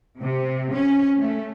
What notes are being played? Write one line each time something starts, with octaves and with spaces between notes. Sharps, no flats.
C3
C#4
A3